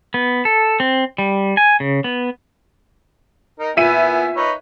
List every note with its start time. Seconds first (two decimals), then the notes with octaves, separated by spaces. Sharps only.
0.14 B3
0.45 A4
0.80 C4
1.18 G3
1.57 G#5
1.80 C#3
2.04 B3
3.59 D#4 A#4
3.77 A#2 B3 E4 E5 G#5 D#7
4.36 D#4 B4 C#5